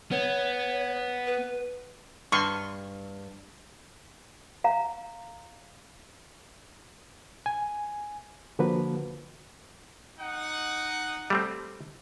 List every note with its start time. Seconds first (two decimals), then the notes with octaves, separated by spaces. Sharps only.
0.11 B3 C#5
1.27 B4
2.32 G2 C6 C#6
4.64 F5 A#5
7.46 G#5
8.59 D3 F3 A#3 F#4 B4
10.18 D#4 F#5
11.30 G3 A3 C4